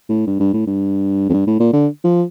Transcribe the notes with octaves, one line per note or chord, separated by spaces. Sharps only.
A2
G2
G2
A2
G2
F2
G2
A2
A#2
D3
F3